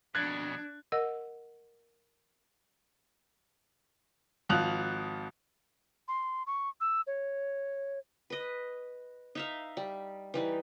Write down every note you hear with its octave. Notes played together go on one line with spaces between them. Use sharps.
F2 B2 D4 F#6 G#6 A6
A#4 D#5 F#5 E6
G#1 F3 D#6 F#6 F7
C6
C#6
E6
C#5
B4 D#5
D#4 E5 F5
G3
E3 G3 D#4